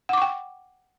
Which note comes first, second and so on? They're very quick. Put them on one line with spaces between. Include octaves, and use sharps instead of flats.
F#5 D6 C#6 G5